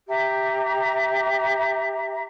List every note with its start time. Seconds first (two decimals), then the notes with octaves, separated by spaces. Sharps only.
0.08 G4 E5 A#5